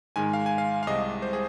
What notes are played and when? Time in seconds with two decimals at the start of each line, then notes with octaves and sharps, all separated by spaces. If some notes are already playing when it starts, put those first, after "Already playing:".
0.16 G#2 D#3 G#3 G#5
0.33 F5
0.46 G#5
0.58 F5
0.83 F5
0.87 C2 C3 G#3 D#5
1.22 C5
1.33 G#4